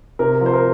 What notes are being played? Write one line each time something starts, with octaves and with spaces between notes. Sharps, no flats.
C3 A#4
F3 C5
A#4